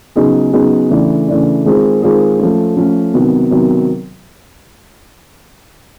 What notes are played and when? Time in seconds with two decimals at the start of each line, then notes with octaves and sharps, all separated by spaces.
0.16 C#3 F#3 B3 D#4 G#4
0.53 C#3 F#3 B3 D#4 G#4
0.90 C#3 E3 A3 D4
1.28 C#3 E3 A3 D4
1.65 D#3 G#3 C4 F4 G#4
2.02 D#3 G#3 C4 F4 G#4
2.39 F3 A3 C#4
2.77 F3 A3 C#4
3.14 C3 D#3 F#3 B3
3.51 C3 D#3 F#3 B3